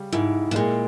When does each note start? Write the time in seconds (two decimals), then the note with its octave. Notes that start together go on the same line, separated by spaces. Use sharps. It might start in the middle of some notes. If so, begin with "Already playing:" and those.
Already playing: C#3 G3
0.12 G#2 E4
0.51 B2
0.55 A#2 G#3